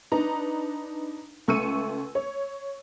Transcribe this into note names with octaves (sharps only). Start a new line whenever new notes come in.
D4 D#4 B4 A#5
C#2 A3 C#6 E6 C#7 D#7
C#5